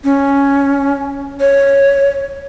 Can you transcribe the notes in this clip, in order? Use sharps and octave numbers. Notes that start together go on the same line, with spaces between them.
C#4
C#5